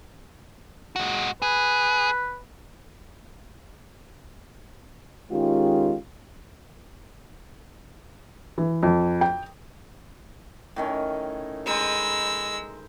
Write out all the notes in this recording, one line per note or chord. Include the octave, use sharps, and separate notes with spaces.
G#3 F#4
G#4 B4
D#3 G#3 C#4 F4 G4
E3
F2
G5
A2 D#3 C#4
G#3 C5 A#5 B5 E6